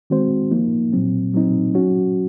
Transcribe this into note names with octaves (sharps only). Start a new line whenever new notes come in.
D#3 G#3 C4 F#4 C5
F3 A#3 D#4
A#2 F#3 C4
A#2 F#3 C4 D#4
F#3 C#4 F#4